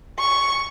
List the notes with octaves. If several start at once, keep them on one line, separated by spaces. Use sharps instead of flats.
C#6